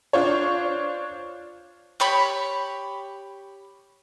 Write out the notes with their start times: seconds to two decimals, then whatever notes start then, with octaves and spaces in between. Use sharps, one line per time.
0.13 D4 F4 C5 C#5
2.00 G4 C#5 B5